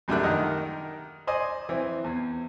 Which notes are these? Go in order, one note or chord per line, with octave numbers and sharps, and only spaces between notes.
A#1 F#2 G3 A3 D4 F#6
D#3 A#4 D#5 F#5
C5 D5 D#5 G#5
E3 C4
E2